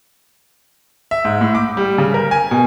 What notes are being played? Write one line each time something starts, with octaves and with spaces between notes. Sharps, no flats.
E5
G#2
A2
D6
G3
C#3
A#4
G#5
B2